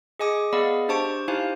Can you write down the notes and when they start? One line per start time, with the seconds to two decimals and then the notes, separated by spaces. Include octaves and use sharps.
0.19 G#4 D#5 G#5 D6 D#6
0.53 B3 G#4 D5 D#5 F5 B5
0.89 D4 G4 C5 A5 C#6 D7
1.28 D#4 E4 G4 C5 F5 G#5